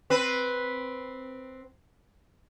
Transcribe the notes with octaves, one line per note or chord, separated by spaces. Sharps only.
C4 B4